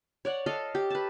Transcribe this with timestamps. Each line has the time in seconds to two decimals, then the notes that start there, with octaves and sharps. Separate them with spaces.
0.25 C#5 D5 F#5
0.46 A4 D#5 F5
0.75 G4
0.90 B4 A5